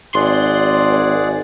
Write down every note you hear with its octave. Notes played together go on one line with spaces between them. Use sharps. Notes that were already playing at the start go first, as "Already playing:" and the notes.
G#1 G#4 D5 F#5 C6